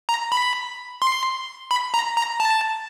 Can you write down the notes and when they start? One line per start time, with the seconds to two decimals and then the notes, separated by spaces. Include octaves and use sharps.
0.09 A#5
0.32 B5
1.02 C6
1.71 B5
1.94 A#5
2.17 A#5
2.40 A5